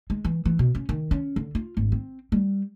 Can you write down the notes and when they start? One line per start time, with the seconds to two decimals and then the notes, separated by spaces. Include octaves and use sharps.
0.10 G#3
0.25 E3
0.45 E3
0.59 B2
0.75 C#4
0.89 D#3
1.11 C#4
1.36 D3
1.55 F4
1.77 G#1
1.92 C4
2.32 G3